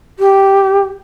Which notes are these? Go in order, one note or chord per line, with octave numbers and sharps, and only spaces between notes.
G4